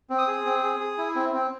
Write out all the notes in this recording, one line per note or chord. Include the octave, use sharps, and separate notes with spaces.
C4
D#6
G#4
C4
G#4
G#4
E4
C4
C4